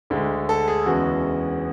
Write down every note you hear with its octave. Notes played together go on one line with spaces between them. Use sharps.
D2 D3 G#3
A4
G#4
E2 C#3 G#3 B3 F#4